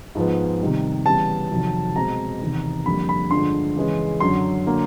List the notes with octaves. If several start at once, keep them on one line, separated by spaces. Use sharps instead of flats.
G#2 F3 G#3 B3
C3 D#3 G3
C#3 E3 G3 B3 A5
F2 C3 D#3 F#3
B2 G#3 C4 A#5
E2 C3 D#3
F2 D3 G3 A#3 B5
B5
G2 D3 F3 G#3 C6
C#3 E3 G#3
F#2 D3 F#3 C6
D3 F#3 A#3